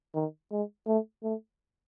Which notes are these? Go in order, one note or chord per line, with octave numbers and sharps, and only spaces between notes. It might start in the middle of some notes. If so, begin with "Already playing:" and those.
D#3
G#3
A3
A3